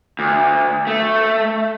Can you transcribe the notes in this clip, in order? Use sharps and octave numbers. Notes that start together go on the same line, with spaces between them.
D2
A3